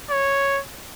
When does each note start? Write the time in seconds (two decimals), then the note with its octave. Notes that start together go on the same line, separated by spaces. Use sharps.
0.11 C#5